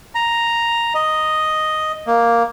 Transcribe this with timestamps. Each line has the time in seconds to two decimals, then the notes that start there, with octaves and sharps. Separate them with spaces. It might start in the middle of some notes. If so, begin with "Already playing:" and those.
0.15 A#5
0.94 D#5
2.07 A#3